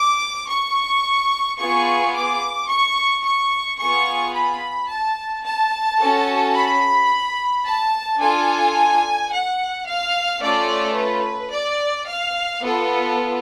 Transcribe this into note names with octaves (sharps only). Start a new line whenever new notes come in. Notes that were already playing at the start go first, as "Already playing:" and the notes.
Already playing: D6
C#6
B3 F4 G#4 C#6
D6
C#6
C#6
B3 F4 G#4 C#6
B5
A5
A5
C#4 F#4 A4
B5
A5
D4 F4 A4 G#5
F#5
F5
A3 C#4 F4 A4 D5
B4
D5
F5
B3 F4 A4